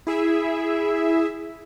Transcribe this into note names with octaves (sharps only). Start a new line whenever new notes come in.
E4 G#4 E5